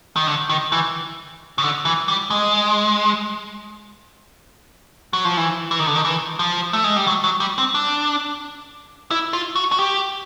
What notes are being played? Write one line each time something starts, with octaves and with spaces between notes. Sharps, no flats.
D#3
D3
D#3
E3
C#3
D3
E3
G3
G#3
F#3
F3
E3
E3
D#3
D3
D#3
E3
F3
A3
G#3
G3
F#3
F#3
G3
C4
D4
E4
F4
F#4
F#4
G4